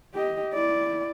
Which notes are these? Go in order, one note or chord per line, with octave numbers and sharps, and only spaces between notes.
G4 D#5
E4 D5